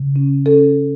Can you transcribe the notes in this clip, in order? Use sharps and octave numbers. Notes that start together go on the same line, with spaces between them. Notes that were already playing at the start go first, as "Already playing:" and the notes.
Already playing: C#3
C#4
C#4 A4